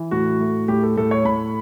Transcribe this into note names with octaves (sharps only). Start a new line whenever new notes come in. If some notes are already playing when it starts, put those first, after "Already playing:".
Already playing: E3
A2 F#4
A3
A2 G4
A4
A2 A4
C#5
A2 B5